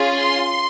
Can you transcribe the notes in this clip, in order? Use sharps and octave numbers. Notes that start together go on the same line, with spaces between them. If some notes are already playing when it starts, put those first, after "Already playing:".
Already playing: C#4 F4 G#4
C6